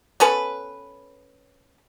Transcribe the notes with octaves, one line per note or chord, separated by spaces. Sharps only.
B3 C#4 A4 B4